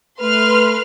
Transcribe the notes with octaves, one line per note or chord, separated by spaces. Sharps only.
A3 B4 C6 F6